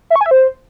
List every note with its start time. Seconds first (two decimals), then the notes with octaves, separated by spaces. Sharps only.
0.10 E5
0.16 C#6
0.21 G#5
0.26 E5
0.31 C5